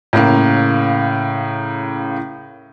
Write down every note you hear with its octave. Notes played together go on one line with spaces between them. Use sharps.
A2 C#3 A#3 F5